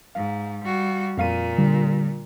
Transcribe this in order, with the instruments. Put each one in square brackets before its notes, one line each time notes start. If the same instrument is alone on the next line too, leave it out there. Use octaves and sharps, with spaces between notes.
[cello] G#2 [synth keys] F5
[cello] G3 F#4
[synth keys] F2 F5 D#7 [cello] A#2
[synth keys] D3 G3